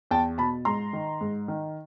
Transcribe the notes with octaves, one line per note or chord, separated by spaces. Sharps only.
E2 G5 A5
B2 A5 B5
G#2 A#5 C6
D#3
G#2
D#3